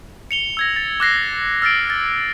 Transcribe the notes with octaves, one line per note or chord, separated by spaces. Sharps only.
C#7 F7 G7
E6 G#6 A#6
A6
D6 F#6 A#6 C7
E6 F6 A6 C7 D7
A6